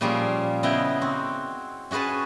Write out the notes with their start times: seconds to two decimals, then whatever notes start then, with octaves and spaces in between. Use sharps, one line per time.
0.01 A#2 F3 G3 C#4 F4 G#4
0.63 C#3 B3 E4 D#5 G5
1.01 C4 F#4
1.91 C#4 F#4 G#4 B4 A5